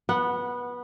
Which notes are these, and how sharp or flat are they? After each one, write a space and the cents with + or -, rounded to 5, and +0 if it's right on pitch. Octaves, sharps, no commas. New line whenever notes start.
B3 -15 F#5 +0